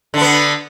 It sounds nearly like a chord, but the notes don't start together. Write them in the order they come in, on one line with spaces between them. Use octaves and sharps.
D3 D4 B3